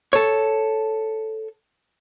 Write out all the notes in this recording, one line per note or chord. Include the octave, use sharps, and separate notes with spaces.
A4 C#5